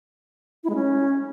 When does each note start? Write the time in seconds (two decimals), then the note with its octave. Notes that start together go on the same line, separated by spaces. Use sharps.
0.64 E4
0.69 G#3
0.75 C#4